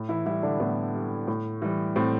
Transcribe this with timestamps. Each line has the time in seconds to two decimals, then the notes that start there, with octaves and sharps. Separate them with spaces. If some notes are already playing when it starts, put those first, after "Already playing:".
Already playing: A2
0.09 E3 E4
0.26 E3 G3 E4
0.43 D3 D4
0.60 A2 B3
0.94 G3
1.27 A2
1.62 E3 G3
1.96 A2 C4